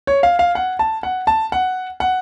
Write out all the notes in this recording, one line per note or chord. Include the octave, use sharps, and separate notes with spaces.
C#5
F5
F5
F#5
A5
F#5
A5
F#5
F#5